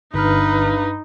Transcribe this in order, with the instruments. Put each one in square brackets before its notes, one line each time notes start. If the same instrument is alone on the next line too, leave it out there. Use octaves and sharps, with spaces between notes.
[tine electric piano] G1 F6 [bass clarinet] G2 [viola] D#4 [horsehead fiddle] B4